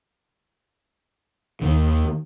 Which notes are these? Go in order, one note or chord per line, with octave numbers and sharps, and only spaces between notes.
D#2 D#3